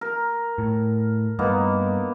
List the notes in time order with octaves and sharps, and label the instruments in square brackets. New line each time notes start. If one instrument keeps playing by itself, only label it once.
[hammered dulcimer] A#4
[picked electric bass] A2
[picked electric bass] G2 [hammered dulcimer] A#3 B3 D#4